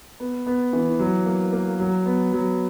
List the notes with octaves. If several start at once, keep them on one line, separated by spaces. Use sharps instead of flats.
B3
B3
E3
F#3
A#3
A#3
F#3
B3
F#3